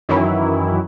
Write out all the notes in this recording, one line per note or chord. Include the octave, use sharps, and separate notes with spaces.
F#2 D#3 E3 F#3 E4